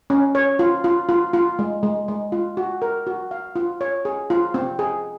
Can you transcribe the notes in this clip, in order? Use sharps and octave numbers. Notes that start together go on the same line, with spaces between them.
C#4
C#5
F4
F4
F4
F4
G#3
G#3
G#3
F4
F#4
A#4
F#4
F5
F4
C#5
G#4
F4
C4
G#4